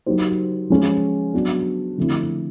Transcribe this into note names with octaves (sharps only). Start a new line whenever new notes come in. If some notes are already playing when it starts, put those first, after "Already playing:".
F#3 A#3 D#4 G4 C5
F3 G#3 C#4 F4
F#3 B3 D4 F#4
D3 F3 A3 C4 E4